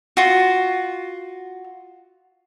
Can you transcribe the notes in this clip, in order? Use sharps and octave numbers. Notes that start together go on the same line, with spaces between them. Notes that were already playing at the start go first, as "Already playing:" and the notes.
F4 F#4